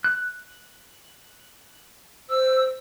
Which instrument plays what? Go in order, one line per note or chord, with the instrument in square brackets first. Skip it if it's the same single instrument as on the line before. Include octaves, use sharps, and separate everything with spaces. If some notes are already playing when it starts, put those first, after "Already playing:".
[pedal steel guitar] F#6
[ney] C5 [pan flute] E6